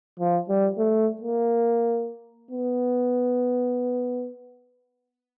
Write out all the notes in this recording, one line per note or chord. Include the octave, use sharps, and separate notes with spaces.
F3
G3
A3
A#3
B3